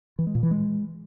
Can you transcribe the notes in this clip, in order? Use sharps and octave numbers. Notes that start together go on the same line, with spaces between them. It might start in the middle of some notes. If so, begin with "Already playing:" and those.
E3
G#3
A#2
E3
G#3